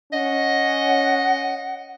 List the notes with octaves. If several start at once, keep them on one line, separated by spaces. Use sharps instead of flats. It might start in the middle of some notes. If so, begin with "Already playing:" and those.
C#4 D#5 F#5